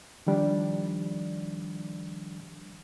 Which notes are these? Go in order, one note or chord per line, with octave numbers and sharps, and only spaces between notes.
D#3 F3 G3 D4